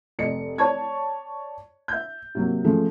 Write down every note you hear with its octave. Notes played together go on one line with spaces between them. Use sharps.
F1 D5 D#5 C#7
C#5 D5 A5 C#6 G#6
E5 G6
C3 F#3 A#3
C#3 F3 G#3 A3